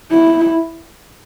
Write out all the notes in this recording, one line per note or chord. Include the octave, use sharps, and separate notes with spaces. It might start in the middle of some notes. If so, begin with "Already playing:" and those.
E4